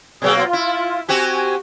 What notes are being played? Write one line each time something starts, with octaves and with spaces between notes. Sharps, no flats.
B2 F#3 A#3 G#4
F4
E4
C4 F#4 G4 G#5